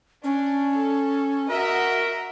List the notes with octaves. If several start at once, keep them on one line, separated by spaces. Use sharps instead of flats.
C#4 D4
A4
F#4 A#4 D#5 E5 F#5